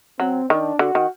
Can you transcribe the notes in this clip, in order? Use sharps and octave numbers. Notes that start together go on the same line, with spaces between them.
F#3 C4
D#3 D4
D3 F#4
D#3